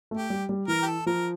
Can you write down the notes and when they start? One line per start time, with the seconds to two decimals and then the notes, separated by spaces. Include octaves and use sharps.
0.11 A3
0.17 G4
0.30 G3
0.49 G3
0.68 E3 A#4
0.82 G4
0.87 A4
1.06 F3 A#4